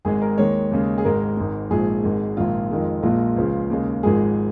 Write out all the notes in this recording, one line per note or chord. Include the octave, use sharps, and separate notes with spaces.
G#1 G#2 G#3 G#4
A#4
D#2 D#3 G#3 C#5
D#2 C#3 G#3
G#4
G#1 G#2 G#3 A#4
G#1 G#2 G#3
A#1 G#2 F3 G#4
G#1 G#2 G#3
A#1 G#2 D#3 F4
F2 D#3 G#3
A#1 A#2 G#3 F4
C#2 C#3 F3
D#2 C#3 G#3
G#1 G#2 F3 G#3 G#4